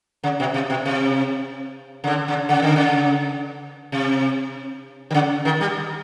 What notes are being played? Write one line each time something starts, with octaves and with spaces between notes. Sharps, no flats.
C#3
B2
C3
B2
C3
C#3
D3
C#3
C#3
D3
C#3
C3
D3
C#3
D#3
G3